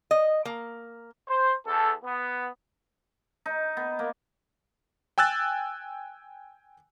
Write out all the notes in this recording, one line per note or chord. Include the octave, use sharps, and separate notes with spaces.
D#5
A#3
C5
E2 A4
B3
D#4
B3
A#3
G5 G#5 E6 F#6 A6